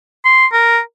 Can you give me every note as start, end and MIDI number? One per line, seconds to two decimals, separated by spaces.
0.25 0.46 84
0.53 0.80 70